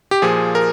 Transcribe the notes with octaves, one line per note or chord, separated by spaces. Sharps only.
G4
A#2 F3 G#4
A#4